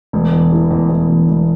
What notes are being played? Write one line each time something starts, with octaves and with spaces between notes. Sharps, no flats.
E1
E2
E3
E2
E2
E1
E1